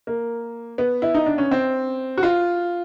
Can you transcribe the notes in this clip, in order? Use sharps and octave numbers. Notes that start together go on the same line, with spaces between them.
A#3
B3
E4
D#4
D4
C#4
C4
F#4
F4